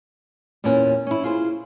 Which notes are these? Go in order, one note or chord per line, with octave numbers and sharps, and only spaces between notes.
E2 A#2 E3 C#4 F#5 G#5
C#4 E4
F4 G#4 C5